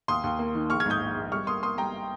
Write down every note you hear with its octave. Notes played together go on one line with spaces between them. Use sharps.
D#2 C6 D#6
D#2
A#3
D#3
A#1 C#6 F6
F6 G#6
G#2 D#6 G6
A#1
A#1
G3 C#6 F6
A#3 C6 D#6
A#3 C6 D#6
G3 G5 A#5